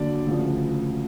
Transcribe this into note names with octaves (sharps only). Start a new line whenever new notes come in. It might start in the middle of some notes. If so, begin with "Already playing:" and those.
Already playing: D#2 D3 F#3 D5
D2 C#3 F3